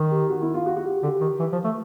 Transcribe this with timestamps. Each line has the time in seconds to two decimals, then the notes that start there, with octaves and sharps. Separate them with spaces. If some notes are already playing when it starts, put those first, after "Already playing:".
Already playing: D#3
0.11 G4
0.30 F#4
0.42 E4
0.54 F4
0.66 F#4
0.77 F#4
0.85 G4
1.03 D3 G4
1.21 D#3
1.39 E3
1.52 F3
1.64 A3